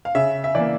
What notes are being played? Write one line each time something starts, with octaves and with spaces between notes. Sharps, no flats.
F5
C#3 E5
E5
E3 A#3 D5